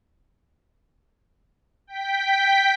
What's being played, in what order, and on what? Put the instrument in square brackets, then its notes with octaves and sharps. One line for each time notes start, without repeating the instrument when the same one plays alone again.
[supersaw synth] G5 B6